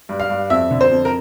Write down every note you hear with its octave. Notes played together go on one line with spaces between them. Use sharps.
G2
F5
G2
F2 E5
D3
C5
F2
A#4